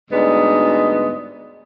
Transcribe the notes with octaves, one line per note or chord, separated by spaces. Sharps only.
D2 G#2 G3 B3 D#5